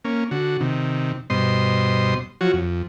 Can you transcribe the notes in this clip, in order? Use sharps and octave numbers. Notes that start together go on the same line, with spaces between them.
A#3 C#4
D3 F#4
C3 D#3
G2 B2 C5 D#5 C6
F3 F#3 F#4 C#5
F2